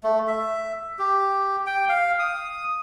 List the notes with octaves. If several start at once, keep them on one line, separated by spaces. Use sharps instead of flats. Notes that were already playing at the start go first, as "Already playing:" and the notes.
A3
E5
G4
G5
F5
D#6